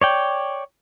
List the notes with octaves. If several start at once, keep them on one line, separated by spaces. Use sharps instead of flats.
C#5 D5 G5